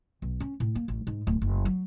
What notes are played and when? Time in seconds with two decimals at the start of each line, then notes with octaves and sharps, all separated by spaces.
0.22 B1
0.40 C#4
0.60 A2
0.75 A#3
0.88 A1
1.07 G#2
1.27 D1
1.42 F#1
1.65 F#3